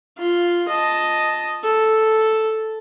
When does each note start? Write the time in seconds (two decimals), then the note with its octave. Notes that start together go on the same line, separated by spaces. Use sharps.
0.18 F4
0.68 D#5 A5
1.64 A4